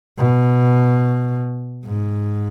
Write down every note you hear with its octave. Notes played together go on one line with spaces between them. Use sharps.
B2
G#2